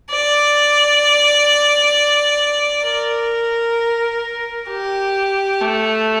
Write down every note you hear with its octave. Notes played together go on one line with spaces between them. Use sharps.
D5
A#4
G4
A3